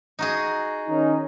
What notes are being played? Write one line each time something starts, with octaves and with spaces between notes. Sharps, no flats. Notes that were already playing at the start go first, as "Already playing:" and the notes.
D#4 F#4 G#4
D#3 C#4 D#4